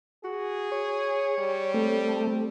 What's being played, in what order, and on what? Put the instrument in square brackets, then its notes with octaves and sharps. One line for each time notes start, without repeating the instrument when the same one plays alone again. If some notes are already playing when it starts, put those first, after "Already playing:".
[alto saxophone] F#4 [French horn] G#4
[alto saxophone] C#5
[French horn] G3
[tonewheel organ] A3 [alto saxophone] C4